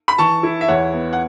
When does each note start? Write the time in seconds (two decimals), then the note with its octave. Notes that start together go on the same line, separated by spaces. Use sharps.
0.08 B5
0.18 E3 A5 C#6
0.43 E4
0.61 E5
0.68 E2 C#5 F#5
0.93 B3
1.13 F#5